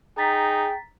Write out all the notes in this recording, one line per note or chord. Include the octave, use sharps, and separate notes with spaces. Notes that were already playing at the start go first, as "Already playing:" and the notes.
D#4 G#4 G5 A#5 A6 B6